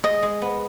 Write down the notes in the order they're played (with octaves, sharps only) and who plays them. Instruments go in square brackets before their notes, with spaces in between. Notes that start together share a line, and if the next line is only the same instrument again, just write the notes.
[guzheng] G#3 [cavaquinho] D#5
[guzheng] G#3
B3